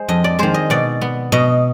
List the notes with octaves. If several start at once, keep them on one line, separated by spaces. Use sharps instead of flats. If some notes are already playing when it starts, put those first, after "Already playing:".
Already playing: G#3 C5
F2 D#5
D5
D#3 G#3 C5
D#5
B2 D5
B3
B2 D#5